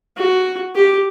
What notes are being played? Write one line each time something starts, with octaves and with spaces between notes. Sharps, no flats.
F#4
G4